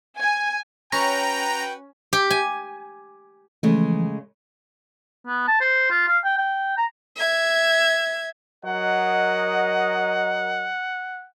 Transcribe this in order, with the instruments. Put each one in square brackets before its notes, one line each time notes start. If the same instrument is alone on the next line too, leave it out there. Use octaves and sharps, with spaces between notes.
[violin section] G#5
[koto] C#4 [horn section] F#4 B4 G5 [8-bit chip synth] A#5
[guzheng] G4
G#5
[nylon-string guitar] C#3 G#3 A3 [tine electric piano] E3 F3
[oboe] B3
A5
C5
F4
F5
G5
G5
A#5
[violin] E5 G#6
[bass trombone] F#3 [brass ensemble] A#4 D#5 [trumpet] F#5